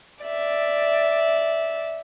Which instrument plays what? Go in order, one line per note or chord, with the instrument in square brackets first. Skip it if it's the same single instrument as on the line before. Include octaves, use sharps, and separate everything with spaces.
[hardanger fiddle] D5 E5